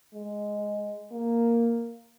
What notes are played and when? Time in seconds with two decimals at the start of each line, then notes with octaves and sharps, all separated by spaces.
0.14 G#3
1.12 A#3